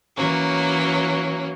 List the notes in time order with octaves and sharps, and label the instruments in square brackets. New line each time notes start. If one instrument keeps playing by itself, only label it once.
[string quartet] E3 F#3 A#3 C#4